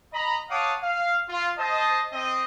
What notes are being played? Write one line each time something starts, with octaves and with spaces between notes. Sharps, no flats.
D#5 A#5 B5
C#5 F5 F#5 A5 D6 D#6
F5
F4
C5 D#5 A5
C4 D#5